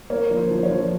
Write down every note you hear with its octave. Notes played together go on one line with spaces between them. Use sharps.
A#3 C#5
F3
C5
F3
C#5
F3